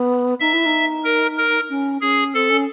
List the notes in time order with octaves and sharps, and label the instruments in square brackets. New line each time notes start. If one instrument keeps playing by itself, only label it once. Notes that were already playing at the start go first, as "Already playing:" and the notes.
Already playing: [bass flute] B3
[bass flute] D#4 [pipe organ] E5
[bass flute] E4
D#4
[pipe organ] A#4
A#4
[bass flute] C#4
[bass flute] C#4 [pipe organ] G#4
[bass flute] C4 [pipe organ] A4
[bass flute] C#4